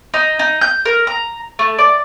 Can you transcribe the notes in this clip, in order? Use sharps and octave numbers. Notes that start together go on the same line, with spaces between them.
D#4
D#4
G6
A#4
A#5
A3
D5